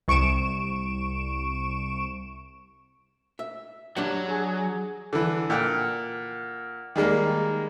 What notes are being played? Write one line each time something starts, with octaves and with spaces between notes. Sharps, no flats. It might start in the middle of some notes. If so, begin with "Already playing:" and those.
C2 C#6 D7 E7
E5
F#3 D4 G4 F#5
G#4
D3 E3
A#2 F#5 G5 F6
D#3 G3 G#3 A#3